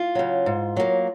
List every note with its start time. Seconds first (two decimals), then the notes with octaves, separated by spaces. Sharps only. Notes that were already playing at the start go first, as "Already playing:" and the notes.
Already playing: F4
0.15 C#3 F#3
0.46 G#2
0.77 F#3 A#3